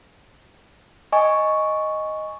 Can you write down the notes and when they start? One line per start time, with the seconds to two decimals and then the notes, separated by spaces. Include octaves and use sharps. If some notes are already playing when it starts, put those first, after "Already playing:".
1.12 D#5 G#5 C#6